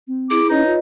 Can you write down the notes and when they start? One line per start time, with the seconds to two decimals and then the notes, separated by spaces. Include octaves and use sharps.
0.07 C4
0.30 E4 G#4 D6
0.50 C#4 D#4 B4 C#5 D#5
0.66 F4